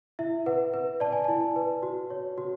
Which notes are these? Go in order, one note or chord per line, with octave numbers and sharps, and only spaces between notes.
E4 E5
B4 F#5
B4
D5 A5
G#5
E4 A5
B4
F#4
C#5
F#4